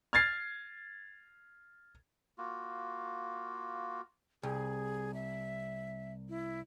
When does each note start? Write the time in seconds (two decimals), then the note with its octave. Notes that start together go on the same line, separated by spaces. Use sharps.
0.13 F6 G#6 A6 C7
2.38 A#3 F4 F#4
4.43 C2 G#4
5.14 E5
6.29 E4